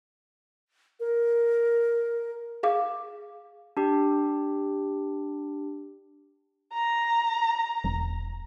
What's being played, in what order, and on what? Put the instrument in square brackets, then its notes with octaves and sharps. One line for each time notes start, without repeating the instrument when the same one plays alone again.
[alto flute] A#4
[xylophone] G#4 F5 D6
[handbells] D4 G4
[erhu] A#5
[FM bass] E1